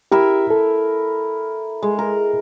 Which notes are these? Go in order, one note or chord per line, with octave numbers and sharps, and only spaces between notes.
E4 G4 A#4 E5
A4
G#3
A#4